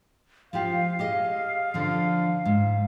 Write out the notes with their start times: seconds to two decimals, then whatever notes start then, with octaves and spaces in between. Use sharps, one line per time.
0.53 F3 F4 G4 F5
0.99 G4 G#4 D#5
1.74 D3 F3
2.45 G#2